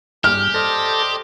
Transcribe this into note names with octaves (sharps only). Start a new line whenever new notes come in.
G2 G4 G#4 F6
A4 C5 D5 D#5 A6 A#6